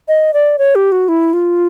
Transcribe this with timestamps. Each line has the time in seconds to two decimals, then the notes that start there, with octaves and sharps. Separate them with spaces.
0.08 D#5
0.34 D5
0.58 C#5
0.75 G4
0.92 F#4
1.09 E4
1.33 F4